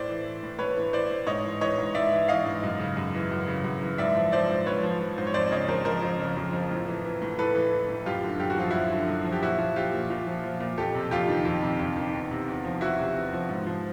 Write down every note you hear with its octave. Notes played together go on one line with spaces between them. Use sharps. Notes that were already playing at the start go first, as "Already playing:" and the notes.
Already playing: A2 C5 D5
E3
E3
A2
A2 B4 C#5
E3
E3 C5 D5
A2
G#2 C#5 D#5
E3
E3 C#5 D#5
G#2
G#2 D5 E5
E3
E3 D#5 F5
G#2
F#2
C#3
F#2
E3
F#2
C#3
F#2
E3
G#2 D5 E5
F3
F3 C5 D5
G#2
G#2 B4 C#5
F3
F3
G#2 C5
C#5
F2 C5 D5
C#3 C#5 D#5
F2 A#4 C5
F3 A#4 C5
F2
C#3
F2
F3
A2
E3
E3
A2
A2 A4 B4
E3
E3
A2
F#2 F4 G4
D3
F#2 G4
F#4
F3 F4
F#2 E4 F#4
D3
F#2
F3
G4
A#2 E4 F#4
F3
F3 F4 G4
A#2
A#2
F3
F3
A#2
F2 G4 A4
C3
F2 F4 G4
D#3
F2
C3
F2
D#3
E2
C3
E2
F3
E2 E4 F#4
C3
E2
F3
G#2
F3